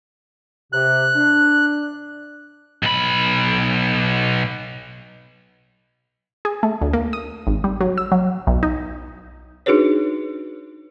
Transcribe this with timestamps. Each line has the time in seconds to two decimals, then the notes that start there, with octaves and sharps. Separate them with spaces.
0.73 C3 F#6
1.15 D4
2.83 B1 B5
6.45 G#4
6.63 A3
6.82 D2
6.93 A#3
7.13 D#6
7.47 G#1
7.64 G3
7.81 F#3
7.98 E6
8.12 F#3
8.47 B1
8.63 D#4
9.66 D4 D#4 F#4 G#4 B4 C#5